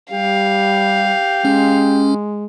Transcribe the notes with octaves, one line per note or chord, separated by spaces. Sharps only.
G3 G4 F5
G#3 C#4